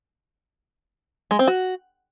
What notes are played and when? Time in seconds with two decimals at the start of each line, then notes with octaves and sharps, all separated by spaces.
1.31 G#3
1.39 C4
1.48 F#4